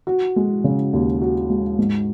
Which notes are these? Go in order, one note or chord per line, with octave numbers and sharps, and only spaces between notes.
F#4
G#3
C#3
D#2
F#4
G#3
G#2